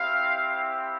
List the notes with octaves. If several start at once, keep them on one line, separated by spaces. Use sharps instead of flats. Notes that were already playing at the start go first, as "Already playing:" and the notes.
Already playing: C4 E4 G4 F5